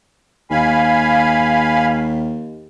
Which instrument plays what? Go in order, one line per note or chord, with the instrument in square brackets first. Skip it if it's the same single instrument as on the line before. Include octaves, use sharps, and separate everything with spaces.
[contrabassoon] D#2 [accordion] F5 G#5 B5